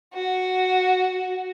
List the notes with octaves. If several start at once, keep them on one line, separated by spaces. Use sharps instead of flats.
F#4